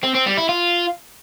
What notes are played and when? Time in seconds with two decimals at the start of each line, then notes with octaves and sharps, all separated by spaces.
0.04 C4
0.15 C4
0.26 G3
0.38 E4
0.49 F4